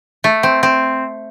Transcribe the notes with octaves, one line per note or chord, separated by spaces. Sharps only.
A3
C4
C4